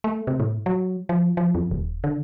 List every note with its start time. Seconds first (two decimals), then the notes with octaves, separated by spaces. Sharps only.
0.04 A3
0.27 C3
0.40 A2
0.66 F#3
1.09 F3
1.37 F3
1.55 F2
1.71 D#1
2.04 D3